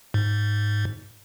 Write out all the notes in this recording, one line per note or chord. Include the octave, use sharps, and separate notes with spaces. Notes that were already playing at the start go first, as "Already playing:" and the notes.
G#2